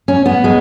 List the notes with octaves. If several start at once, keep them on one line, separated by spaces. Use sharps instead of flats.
C#4
B3
G#3